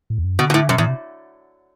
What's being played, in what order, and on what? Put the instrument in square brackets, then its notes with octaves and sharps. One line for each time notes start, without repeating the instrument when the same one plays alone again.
[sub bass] A2
E2
F#2
[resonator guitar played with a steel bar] B2 [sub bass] D3
[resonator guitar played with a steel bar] B2
A2
[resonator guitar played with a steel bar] F#2 [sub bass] B2
[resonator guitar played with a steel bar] E2 [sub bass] A2
[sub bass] C3